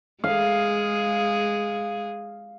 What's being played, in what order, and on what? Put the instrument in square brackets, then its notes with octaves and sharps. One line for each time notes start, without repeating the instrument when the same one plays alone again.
[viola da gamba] G#3 G#4 [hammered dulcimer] F5